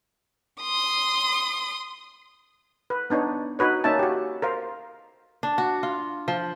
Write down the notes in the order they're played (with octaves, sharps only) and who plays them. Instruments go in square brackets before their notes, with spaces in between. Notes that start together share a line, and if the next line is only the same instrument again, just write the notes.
[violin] C6 D#6
[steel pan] B4
B3 D4 D#4 C#5
D#4 F#4 B4 C#5
A#3 C#4 D#4 E5 A5
F#4 G4
A#4 C5 F5
[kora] D4
F#4
F4
F3